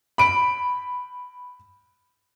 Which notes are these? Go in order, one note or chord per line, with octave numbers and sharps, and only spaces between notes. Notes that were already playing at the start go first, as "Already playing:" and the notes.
B5 D7